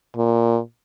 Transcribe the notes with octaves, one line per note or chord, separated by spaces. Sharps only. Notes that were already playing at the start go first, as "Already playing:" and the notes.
A#2